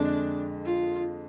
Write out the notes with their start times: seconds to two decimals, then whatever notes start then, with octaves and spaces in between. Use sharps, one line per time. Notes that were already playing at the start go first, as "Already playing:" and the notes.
Already playing: F2 D3 G#3 D4
0.65 F4